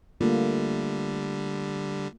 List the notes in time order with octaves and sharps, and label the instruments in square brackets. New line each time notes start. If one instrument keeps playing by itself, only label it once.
[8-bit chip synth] D3 G3 [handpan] A3 A#3 F4